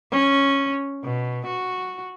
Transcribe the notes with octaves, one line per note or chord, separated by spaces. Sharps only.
C#4
B2
F#4